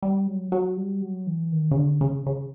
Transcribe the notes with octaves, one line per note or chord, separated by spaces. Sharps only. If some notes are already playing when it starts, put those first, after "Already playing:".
G3
F#3
F#3
G3
F#3
E3
D#3
C#3
D3
C#3
C#3